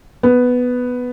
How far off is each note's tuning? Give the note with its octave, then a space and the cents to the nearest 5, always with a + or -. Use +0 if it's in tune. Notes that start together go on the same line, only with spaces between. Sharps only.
B3 +5